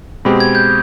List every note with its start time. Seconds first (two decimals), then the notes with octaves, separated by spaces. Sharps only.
0.25 B2 G#3 C4 G4 B5
0.40 G#6
0.55 G6